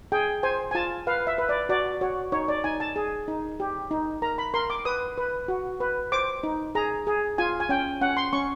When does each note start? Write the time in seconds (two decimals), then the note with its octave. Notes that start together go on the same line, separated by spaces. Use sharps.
0.12 G#4 G5
0.43 C5 G#5
0.71 G#5
0.75 F4 A5
1.07 B4 F5
1.27 E5
1.38 B4
1.49 D5
1.69 F#4 D5
2.01 F#4 C#5
2.32 D#4 C#5
2.48 D5
2.64 D#4 G#5
2.80 A5
2.96 G#4
3.28 D#4
3.60 G4
3.91 D#4
4.22 A#4 A#5
4.38 B5
4.54 A#4 C6
4.70 D6
4.85 B4 D#6
5.17 B4
5.48 F#4
5.80 B4
6.12 C5 D6
6.43 D#4
6.75 G#4 A#5
7.07 G#4
7.38 F4 G#5
7.60 G#5
7.69 C#4 G5
8.01 C#4 F#5
8.17 C6
8.33 C#4 C#6